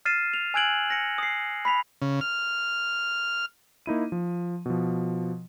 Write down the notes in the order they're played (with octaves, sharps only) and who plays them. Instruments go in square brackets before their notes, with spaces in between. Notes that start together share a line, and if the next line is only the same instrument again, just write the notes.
[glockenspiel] F6 A6 C7 D#7 E7
F7
G#5 E6 F#6 G#6 D7 F#7
A#6 C#7
D#6 C7
B5 B6 F7
[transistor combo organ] C#3
F6
[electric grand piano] A#3 D#4 E4 D#7
F3
B2 F3